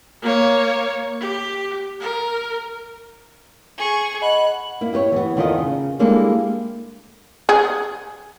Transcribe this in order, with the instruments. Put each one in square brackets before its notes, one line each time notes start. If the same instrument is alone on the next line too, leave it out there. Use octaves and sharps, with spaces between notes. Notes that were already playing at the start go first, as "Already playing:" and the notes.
[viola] A#3 C#5
G4
A#4
[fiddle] G#4 C#6
[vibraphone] D#5 F#5 B5 [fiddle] F#6
[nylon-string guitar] A#3 E4
E4 G4 B4 C#5
E3 B3
E2 D#3 B3 F4 A4 D#5
C#3
G3 G#3 A#3 D4 E4 A4
[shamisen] G#4